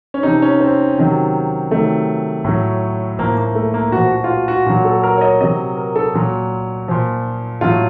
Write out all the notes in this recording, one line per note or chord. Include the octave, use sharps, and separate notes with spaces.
C#4
C3 F3 D#4
C#4
C4
C3 D#3 F#3
C3 D#3 F#3 A3
A2 F#3
A2 F3 A#3
A#3
A3
A#3
A#2 F3 F#4
F#4
F4
F#4
F#4
A#2 F#3 F#4
A4
A#4
C#5
D#5
C3 F#3 D#5
A#4
A4
A#2 F#3
A#2 F3
A2 F#3 F4